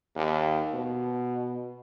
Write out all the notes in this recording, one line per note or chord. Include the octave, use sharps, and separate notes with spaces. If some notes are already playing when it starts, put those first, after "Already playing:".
D#2
B2